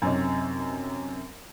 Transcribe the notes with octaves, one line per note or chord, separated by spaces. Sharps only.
F#2 C3 C#4 D#4